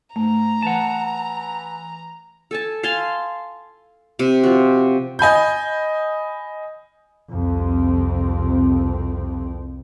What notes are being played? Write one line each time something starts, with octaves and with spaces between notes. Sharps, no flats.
G#2 A3 A#5
E3 F#5 A5
A4 G#5 A5
F5 G#5 A5 C6
C3
F3 F#4
D#5 G#5 B5 G6
C2 F2 C3 C4